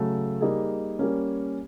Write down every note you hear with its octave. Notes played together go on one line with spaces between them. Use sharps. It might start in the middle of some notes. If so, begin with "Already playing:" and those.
Already playing: C#3 F#3 A3
G3 A#3 D#4 G#4
G3 A#3 C#4